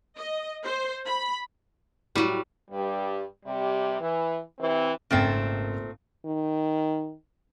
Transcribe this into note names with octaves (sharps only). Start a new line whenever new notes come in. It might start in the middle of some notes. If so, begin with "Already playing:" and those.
D#5
C5
B5
A2 F#3 G3
G2 G3
C3 G3
E3
C3 E3 C4
G#1 A#2 C#3 A3 C4
D#3